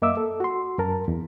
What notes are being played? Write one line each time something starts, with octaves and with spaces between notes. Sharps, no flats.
F#2 A#3 D#5 E5 D6 E6
A4
F#4 C6
F#2 A#4 A5
E2